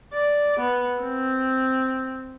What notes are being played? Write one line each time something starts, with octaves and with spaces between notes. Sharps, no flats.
D5
B3
C4